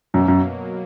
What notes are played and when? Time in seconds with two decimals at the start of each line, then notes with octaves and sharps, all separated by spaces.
0.14 F#2 B2 F#3 A#3
0.28 F#2